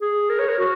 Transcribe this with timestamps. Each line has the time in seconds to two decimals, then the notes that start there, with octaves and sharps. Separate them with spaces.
0.01 G#4
0.30 A#4
0.39 C#5
0.49 A#4
0.58 F#4